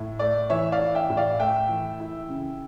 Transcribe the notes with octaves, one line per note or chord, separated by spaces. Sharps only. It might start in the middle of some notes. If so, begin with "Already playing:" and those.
Already playing: A2 E4
A3 D5
E3 C#5 E5
D5 F5
E4
E5 G5
A2
D5 F5
A3 E5 G5
E3
E4
C#3